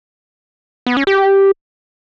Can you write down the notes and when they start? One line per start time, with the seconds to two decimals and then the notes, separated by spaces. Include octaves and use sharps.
0.87 B3
0.97 C#4
1.07 G4